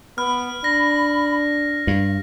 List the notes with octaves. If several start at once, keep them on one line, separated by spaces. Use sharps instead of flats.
B3 B5 F6
D4 A#6
G2 F5